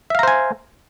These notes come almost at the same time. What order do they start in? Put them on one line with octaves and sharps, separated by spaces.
E5 F5 A#5 C5 G#5